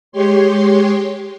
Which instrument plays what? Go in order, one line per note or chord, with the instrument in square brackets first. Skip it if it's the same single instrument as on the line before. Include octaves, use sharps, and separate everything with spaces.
[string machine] G#3 G4 C#5 C6